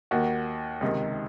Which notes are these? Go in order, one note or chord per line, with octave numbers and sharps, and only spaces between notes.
D#2 D#3 F#4
C#2 C3 D#3 D#4